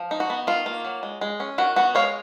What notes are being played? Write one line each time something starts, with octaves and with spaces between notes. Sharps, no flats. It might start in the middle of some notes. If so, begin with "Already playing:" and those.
Already playing: F3
D#4
F#4
B3
D#3 F4
A#3
F#3
G#3
G#3
C#4
D#3 F#4
B3 F#4
G#3 C#5 F5